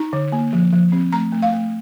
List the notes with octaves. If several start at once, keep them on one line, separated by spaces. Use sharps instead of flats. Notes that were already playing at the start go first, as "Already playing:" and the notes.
Already playing: D#4 A#5
D3
A#3
F3
F3
C4
A3 A#5
A3
F5
A3